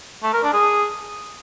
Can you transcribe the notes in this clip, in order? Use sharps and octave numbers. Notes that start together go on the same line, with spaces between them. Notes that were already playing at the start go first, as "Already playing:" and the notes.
A3
A#4
D4
G#4